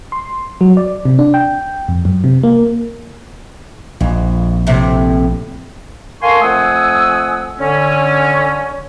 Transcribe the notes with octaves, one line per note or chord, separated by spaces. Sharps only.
C6
F#3
D5
C3
D4
G5
F2
F#2
C3
A#3
A#1 F2
A2 C3
A4 A#4 F5 G#5 C6 C#6
F2 A3 F#5 G#5 D#6 E6
D3 C#4